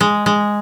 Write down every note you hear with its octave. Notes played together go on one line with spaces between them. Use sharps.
G#3
G#3